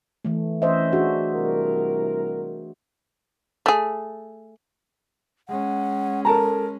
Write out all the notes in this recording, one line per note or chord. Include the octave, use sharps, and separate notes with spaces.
E3 A3
E3 C#4 C5 D#5 E5
D4 F#4 G#4
C2 A#4
A3 G#4
G#3 C#4 F#5
A4 A#4 A5 A#5